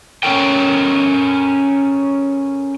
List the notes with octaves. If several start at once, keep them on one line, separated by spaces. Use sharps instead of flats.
C#4 D4 A4 A#4 G5